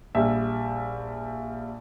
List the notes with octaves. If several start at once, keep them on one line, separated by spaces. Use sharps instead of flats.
A#1 G3 E5